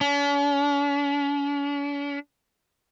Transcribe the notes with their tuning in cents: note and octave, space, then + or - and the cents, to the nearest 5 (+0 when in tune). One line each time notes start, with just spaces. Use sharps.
C#4 +45